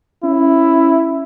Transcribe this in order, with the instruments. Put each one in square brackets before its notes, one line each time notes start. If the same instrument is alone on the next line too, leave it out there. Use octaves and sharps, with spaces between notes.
[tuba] C#4 [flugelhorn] E4